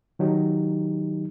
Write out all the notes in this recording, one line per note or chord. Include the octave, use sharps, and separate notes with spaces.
D#3 F#3 D#4 G4